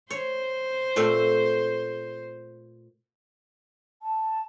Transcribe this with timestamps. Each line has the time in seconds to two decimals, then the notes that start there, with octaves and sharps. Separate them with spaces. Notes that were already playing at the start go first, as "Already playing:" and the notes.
0.10 C5 C#5
0.96 A#2 A3 C4
4.02 A5